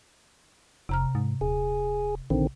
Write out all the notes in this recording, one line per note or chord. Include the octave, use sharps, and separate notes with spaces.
F1 C3 A#5 F6
G#2
D#1 G#4
A#1 D3 D#3 C4